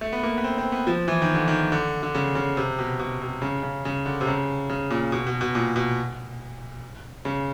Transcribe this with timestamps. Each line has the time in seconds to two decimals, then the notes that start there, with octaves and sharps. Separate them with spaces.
0.01 A3
0.13 B3
0.23 A#3
0.38 B3
0.44 C4
0.58 C4
0.72 B3
0.87 F3
1.08 E3
1.22 D#3
1.34 D3
1.48 D#3
1.72 D3
2.03 D3
2.15 C#3
2.35 C#3
2.57 C3
2.79 B2
2.99 B2
3.21 C3
3.42 C#3
3.63 C#3
3.85 C#3
4.06 D3
4.21 C3
4.27 C#3
4.70 C#3
4.91 A#2
5.12 B2
5.27 B2
5.41 B2
5.55 A#2
5.76 B2
7.25 C#3